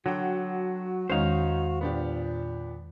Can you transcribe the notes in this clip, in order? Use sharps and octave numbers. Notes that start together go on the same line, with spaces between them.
D3 F#3 F#4 G5
E2 D#3 G#3 C#4 D#4 C5 F5
A#2 B3 D4 G4